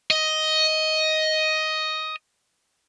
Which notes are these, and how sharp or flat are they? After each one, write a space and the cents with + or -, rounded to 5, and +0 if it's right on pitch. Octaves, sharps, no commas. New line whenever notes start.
D#5 +10